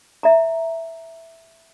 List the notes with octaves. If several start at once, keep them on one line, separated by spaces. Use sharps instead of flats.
E5 A#5